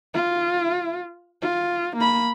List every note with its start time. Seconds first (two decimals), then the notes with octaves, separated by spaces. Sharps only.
0.14 F4
1.42 F4
1.96 A#3 B5